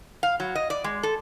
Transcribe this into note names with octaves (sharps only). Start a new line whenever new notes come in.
F5
F#3
D#5
D5
G#3
A4